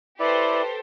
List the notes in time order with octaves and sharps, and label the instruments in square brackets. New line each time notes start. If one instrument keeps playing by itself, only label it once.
[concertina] E4 D5 [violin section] G4 A4 C5 [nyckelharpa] B4